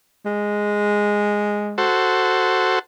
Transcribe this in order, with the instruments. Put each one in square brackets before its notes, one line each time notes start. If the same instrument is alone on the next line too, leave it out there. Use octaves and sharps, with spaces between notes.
[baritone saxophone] G#3
[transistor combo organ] F#4 A4 C5